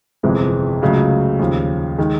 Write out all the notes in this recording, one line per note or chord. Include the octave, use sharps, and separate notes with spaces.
G1 F2 C3 E3 G#3
C#2 C#3 F#3 A3
D#2 C#3 F3
D#3 G#3